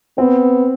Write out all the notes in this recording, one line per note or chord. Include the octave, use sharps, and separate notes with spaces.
B3 C4